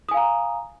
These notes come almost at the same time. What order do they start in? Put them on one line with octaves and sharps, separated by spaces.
D#6 G#5 F5 A#5